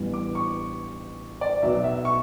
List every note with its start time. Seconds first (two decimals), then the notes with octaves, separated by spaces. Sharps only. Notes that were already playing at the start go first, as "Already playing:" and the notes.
Already playing: A1 G2 E3 G3 B3
0.13 D6
0.35 C#6
1.41 D5
1.62 B1 B2 F#3 B3 E5
1.84 E5
2.05 C#6